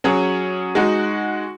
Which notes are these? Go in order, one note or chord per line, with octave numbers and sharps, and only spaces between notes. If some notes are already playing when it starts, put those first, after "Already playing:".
F#3 C#4 G#4 C#5
G#3 D#4 F#4